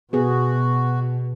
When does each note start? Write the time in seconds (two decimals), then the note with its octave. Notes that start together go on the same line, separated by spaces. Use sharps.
0.13 B2 B3 F#4 G#4